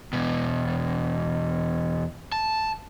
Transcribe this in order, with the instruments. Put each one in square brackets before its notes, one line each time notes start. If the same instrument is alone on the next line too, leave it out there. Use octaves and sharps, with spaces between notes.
[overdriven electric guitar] E2 B2
A5